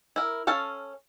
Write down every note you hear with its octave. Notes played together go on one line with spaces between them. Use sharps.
E4 A#4
C#4 A4 F5 A5